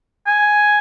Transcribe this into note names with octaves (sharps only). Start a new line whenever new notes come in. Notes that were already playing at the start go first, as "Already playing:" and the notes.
G#5